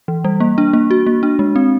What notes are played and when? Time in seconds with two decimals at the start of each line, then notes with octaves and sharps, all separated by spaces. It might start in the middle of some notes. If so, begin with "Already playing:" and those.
0.08 E3
0.24 G3
0.40 A#3
0.58 D4
0.73 A#3
0.91 F#4
1.07 A#3
1.23 D4
1.39 G#3
1.56 C4